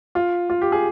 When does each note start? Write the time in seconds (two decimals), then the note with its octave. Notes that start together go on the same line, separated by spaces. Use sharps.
0.15 F4
0.50 F4
0.62 G4
0.72 G#4